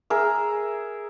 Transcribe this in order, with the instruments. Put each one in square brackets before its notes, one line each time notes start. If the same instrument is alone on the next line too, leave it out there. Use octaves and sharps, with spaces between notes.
[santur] G#4 A#4 E5